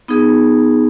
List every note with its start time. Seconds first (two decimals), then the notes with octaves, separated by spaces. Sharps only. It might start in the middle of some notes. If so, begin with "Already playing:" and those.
0.08 B3 D#4 G#4